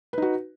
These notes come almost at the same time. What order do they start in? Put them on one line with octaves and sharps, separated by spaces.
B4 D#4 F#4